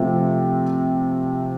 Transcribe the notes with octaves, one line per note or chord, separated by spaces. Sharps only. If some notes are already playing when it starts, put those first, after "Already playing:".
Already playing: C3 F3 A3